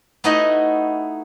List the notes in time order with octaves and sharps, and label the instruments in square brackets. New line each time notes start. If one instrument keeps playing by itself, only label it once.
[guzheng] A3 B3 D#4 E4 F#4 D#5